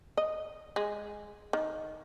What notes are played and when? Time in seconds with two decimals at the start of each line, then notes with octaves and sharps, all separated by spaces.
0.17 D#5
0.76 G#3
1.53 D#3